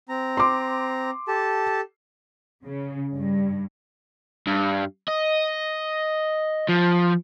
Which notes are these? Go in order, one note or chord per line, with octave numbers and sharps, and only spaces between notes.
C4 A#5
C6 D6
G4 A4 A5
C#3
G2
G2
D#5
F3